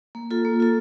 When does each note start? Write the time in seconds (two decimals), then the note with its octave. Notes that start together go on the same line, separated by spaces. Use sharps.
0.15 A#3
0.31 F4 A4
0.45 A#3
0.60 F4 A4